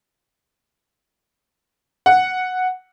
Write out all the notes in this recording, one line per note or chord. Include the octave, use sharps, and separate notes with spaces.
F#5